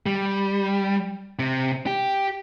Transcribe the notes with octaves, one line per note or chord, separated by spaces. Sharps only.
G3
C3
G4